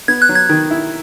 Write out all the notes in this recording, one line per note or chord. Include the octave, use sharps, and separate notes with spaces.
B3 G#6
F#6
F#3
G#6
D#3
E4